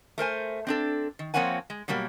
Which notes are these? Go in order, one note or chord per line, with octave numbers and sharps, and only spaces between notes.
A3 A#4 C5 G#5
C4 D4 A4
D#3
F3 A#3 C4 C#5 F#5 G#5
G#3
B2 F#3 G3 A#3